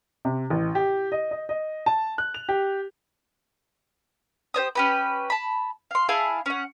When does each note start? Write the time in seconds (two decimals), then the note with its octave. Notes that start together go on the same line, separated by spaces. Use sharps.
0.25 C3
0.50 A1
0.75 G4
1.12 D#5
1.31 D#5
1.49 D#5
1.86 A5
2.18 F#6
2.34 F7
2.49 G4
4.54 G4 C5 C#5 D#6
4.75 C#4 G4 B4
5.30 A5 B5
5.91 F5 C6
6.09 E4 G#4 F5 A5
6.46 C#4 F#5